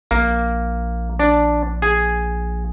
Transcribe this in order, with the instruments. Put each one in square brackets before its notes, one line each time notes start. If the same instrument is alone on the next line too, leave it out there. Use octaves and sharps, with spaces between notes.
[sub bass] A#1 [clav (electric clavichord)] A#3
[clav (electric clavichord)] D4
G#4